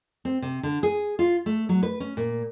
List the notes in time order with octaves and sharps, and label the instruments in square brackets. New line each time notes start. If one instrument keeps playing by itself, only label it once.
[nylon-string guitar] C4
C3
D3
G#4
F4
A3
F#3
B4
C#4
A#2